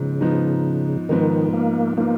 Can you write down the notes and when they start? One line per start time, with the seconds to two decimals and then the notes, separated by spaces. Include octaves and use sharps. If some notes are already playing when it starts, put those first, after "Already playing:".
Already playing: G#2 C#3 F3 B3 D#4
0.21 G#2 F3 B3 D#4
1.09 G#2 D#3 F3 B3 D#4
1.54 A#3
1.98 F3 A#3 B3 D#4